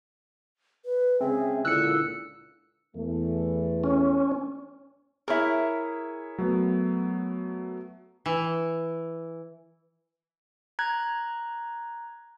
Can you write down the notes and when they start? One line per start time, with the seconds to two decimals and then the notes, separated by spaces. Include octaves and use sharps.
0.85 B4
1.20 C#3 G#3 C4 G#4 E5
1.65 C#2 A#2 D3 E4 E6 F#6 C#7
2.96 E2 E3 A3
3.84 C#4
5.28 E4 G#4 A#4 C#5 E5
6.38 F#3 A3 B3
8.26 E3
10.79 A#5 F#6 G#6